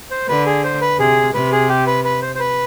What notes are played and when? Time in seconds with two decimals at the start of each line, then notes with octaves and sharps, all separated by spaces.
0.11 C5
0.28 D3 B4
0.46 G#4
0.64 C5
0.81 B4
0.99 C3 G#4
1.34 C3 B4
1.52 G#4
1.69 G4
1.87 B4
2.04 B4
2.22 C5
2.35 C5
2.40 B4